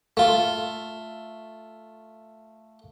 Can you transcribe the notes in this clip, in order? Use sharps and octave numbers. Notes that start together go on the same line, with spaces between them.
A3 F4